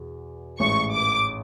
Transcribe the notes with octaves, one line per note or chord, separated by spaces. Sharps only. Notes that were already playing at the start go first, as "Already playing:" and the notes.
Already playing: E2 B2 G#4
A1 G#2 G#3 C#6
D6